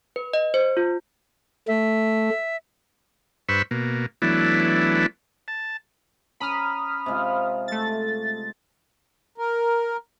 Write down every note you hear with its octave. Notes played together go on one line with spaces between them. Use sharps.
B4
D#5
C5
F4
A3 E5
G2 B4 C5 B5 C#6 E6
B2 A#3
E3 F#3 A3 B3 D4 E4
A5
C#4 A#5 B5 D#6 F6
C3 G#3 F4
A3 A6
A#4